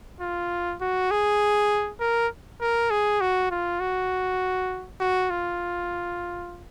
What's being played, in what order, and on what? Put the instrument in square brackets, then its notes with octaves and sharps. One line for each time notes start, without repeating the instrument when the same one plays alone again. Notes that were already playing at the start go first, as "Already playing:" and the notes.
[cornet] F4
F#4
G#4
A#4
A#4
G#4
F#4
F4
F#4
F#4
F4